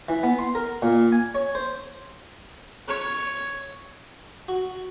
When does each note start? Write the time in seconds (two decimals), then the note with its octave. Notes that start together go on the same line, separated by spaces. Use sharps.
0.09 E3
0.23 B3
0.39 C6
0.55 A#4
0.82 A#2
1.12 G#5
1.35 C#5
1.55 C5
2.88 C#5
4.48 F#4